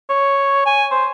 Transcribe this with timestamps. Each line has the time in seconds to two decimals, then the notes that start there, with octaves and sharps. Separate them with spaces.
0.10 C#5
0.66 G#5
0.91 C5